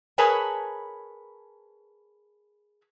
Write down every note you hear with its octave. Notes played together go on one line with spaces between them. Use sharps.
G#4 A#4 B4 C#5 G#5 A5